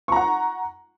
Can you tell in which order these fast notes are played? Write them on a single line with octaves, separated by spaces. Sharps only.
C#6 A#5 F#5